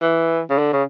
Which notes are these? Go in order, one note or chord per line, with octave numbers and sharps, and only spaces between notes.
E3
C#3
D3
C#3